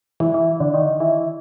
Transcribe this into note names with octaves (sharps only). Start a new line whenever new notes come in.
E3
E3
D3
D#3
E3